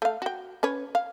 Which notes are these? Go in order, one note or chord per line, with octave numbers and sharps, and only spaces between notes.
A3 F5
F#4 G5
C#4 B4 C#5
F5